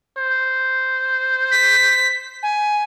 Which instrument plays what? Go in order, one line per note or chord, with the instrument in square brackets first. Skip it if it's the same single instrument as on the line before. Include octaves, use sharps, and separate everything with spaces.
[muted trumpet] C5
[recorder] B6
G#5